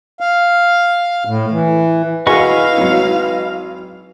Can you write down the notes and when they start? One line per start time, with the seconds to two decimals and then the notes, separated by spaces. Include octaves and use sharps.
0.20 F5
1.26 A2
1.51 E3
2.27 E4 F#4 G#4 B4 D#5 F5 G#5 C#6
2.77 G#1 F#3